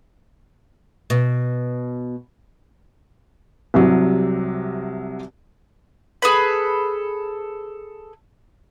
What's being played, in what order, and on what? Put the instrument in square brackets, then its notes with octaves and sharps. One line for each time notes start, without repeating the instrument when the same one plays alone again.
[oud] B2
[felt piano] C2 C3 F#3
[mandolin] G#4 A4 B4 B5